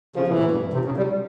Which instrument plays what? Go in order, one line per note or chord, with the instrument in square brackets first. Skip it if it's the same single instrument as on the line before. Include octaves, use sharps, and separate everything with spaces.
[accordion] C#3 [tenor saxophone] F3
[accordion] B2
[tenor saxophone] E3
[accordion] A#2
G2
C3
C#3
G3